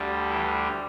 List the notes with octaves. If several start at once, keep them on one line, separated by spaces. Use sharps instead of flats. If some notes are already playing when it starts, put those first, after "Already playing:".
Already playing: D2 D3 G3
E3 E4